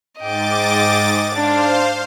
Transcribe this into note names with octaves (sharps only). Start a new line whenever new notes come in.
G#2 D#5 G5 D6 A6
D4 C5 F5